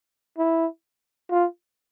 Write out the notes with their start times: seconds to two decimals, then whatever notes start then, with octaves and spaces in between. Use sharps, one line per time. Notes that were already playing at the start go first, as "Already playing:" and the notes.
0.38 E4
1.31 F4